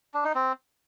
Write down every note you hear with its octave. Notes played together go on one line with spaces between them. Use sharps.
D4
D#4
C4